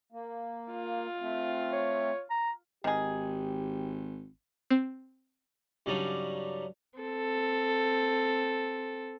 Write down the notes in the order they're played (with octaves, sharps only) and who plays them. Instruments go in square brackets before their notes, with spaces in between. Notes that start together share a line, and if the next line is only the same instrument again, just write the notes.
[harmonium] A#3
[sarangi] F4
[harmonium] A3 C4
[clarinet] C#5
A#5
[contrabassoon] G#1 [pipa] D#3 G#4 [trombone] G4
[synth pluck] C4
[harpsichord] G2 C#3 F#3 G3 D4 D#4
[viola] C4 A4